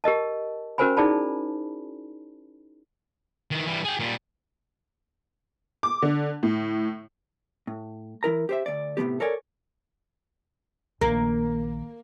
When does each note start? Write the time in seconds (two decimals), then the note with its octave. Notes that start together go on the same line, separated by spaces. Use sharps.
0.04 G4 A#4 D#5 A5
0.78 C#4 F#4 A#4 C5 G#5 B5
0.97 D#4 E4 G#4 D5 A5 B5
3.51 D#3 E3
3.67 E3 G3
3.85 G#4 G5
3.99 A#2 G3
5.83 D6
6.02 D3
6.43 A2
7.67 A2
8.23 E3 E4 A#4 A#5
8.49 G4 C5 E5
8.66 D2 D5
8.97 A2 C3 E3 B3 G4
9.20 A4 A#4 C#5 D5 G#5
11.01 A#1 D#3 A#3